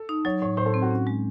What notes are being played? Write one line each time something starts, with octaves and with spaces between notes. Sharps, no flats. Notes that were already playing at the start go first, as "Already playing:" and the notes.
Already playing: A4
D#4
F#3 C#5
A2 C#5
A2 C5
A4
C4
F#4
C#4
G#3